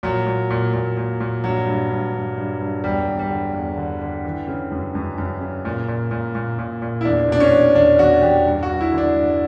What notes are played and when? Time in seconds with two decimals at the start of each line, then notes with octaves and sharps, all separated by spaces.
0.03 A#2 F#3
0.26 A#2
0.50 A#2
0.73 A#2
0.97 A#2
1.20 A#2
1.44 G2 F#3
1.67 G2
1.90 G2
2.14 G2
2.37 G2
2.61 G2
2.84 E2 G3
3.07 E2
3.19 G3
3.30 D3
3.54 E2
3.77 D3
4.01 D3
4.25 E3
4.48 C#3
4.71 F#2
4.95 F#2
5.18 F#2
5.41 C#3
5.65 A#2
5.88 A#2
6.11 A#2
6.35 A#2
6.59 A#2
6.82 A#2
7.01 E4
7.05 E2 D4
7.28 B2 D4
7.40 C#4
7.52 E2
7.75 E2 D4
7.99 E2 F#4
8.22 E2 G4
8.46 G2
8.63 F#4
8.69 G2
8.81 E4
8.92 D3
8.98 D4
9.16 G2